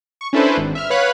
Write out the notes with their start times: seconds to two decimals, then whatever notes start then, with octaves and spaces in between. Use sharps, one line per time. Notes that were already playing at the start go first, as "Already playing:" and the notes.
0.21 C#6
0.33 C#4 D4 E4 A4 B4 C5
0.57 G#1
0.75 E5 F6
0.90 B4 C#5 F5 F#5 B5 F#6